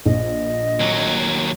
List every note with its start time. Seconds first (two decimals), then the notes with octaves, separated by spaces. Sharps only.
0.05 A#1 D#5
0.79 D#2 F#3